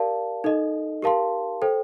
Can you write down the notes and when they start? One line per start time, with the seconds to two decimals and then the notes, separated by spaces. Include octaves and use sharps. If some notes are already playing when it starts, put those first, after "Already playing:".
Already playing: G4 A#4 D5 F5 A5
0.44 D#4 A4 D#5
1.02 G4 A#4 F5 A5 C6
1.62 A4 C5 G5